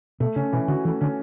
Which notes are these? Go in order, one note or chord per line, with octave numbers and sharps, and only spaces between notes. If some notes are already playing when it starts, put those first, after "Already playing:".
B2 A3
C#3 C#4
B2 E3
D3 F#4
E3 A3
D3 C#4